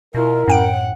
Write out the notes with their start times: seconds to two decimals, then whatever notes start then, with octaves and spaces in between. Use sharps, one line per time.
0.15 B2 E4 F4 A#4
0.48 F#2 A2 F#5 G5 D7